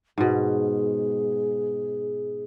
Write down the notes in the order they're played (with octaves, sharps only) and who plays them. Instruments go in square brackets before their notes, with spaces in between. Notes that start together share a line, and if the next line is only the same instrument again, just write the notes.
[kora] G#2 B2 [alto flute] G#4